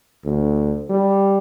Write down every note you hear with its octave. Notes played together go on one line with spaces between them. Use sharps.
D2
G3